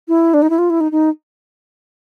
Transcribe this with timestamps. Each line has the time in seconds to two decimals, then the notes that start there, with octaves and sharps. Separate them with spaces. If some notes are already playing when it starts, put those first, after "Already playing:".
0.08 E4
0.34 D4
0.42 D#4
0.50 E4
0.58 F4
0.70 E4
0.80 D#4
0.92 D#4